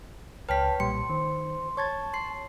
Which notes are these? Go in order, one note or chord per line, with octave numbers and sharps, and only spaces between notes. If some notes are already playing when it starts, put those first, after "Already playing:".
C#2 B4 C#5 G5 A5 F6 B6
B1 A#2 G3 C6 C#7
D#3 C5
C#5 A5 C#6 G#6 A6
C6 C7